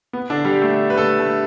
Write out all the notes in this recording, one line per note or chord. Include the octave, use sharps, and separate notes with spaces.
B3
D3 D4
G3 G4
A3 A4
B4
A3 A4
A3